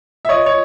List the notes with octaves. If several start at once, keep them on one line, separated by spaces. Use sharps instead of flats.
E5
C#5 D#5
C#5